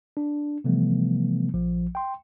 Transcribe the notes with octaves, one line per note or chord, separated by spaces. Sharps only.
D4
C3 E3 F3 G3 A3 B3
A#1 F3
G5 C6